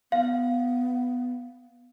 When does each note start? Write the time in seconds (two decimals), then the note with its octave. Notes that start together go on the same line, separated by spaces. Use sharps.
0.12 B3 F5